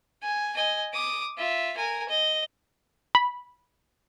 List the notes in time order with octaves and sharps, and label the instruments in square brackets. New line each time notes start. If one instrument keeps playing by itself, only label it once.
[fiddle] G#5
D#5 G#5
D6 D#6
F4 E5
A#4 G#5
D#5
[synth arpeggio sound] B5